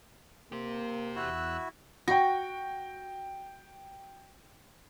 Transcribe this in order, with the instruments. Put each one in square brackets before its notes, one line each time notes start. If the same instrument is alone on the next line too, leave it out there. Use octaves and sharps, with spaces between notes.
[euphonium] A#3 [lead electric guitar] G4 C5
[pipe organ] E2 E6 F#6 [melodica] E4 F#4
[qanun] F#4 [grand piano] G5 A#6